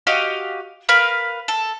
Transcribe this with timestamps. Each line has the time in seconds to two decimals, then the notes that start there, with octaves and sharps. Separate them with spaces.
0.07 F#4 G4 D#5 F5
0.89 A#4 B4 F5
1.48 A4